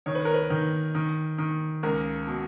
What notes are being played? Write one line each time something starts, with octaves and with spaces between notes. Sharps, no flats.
D#3 C#5
B4
A#4
B4
D#3
D#3
D#3
C#2 A#4
B2